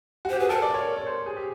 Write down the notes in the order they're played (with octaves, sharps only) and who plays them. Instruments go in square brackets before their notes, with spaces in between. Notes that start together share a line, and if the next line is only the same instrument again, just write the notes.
[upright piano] F#4
[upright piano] G4 [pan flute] C5
[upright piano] G#4 [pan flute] B4
[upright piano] A4 [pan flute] A#4
[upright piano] D5
C#5
C#5
C5
G#4
G4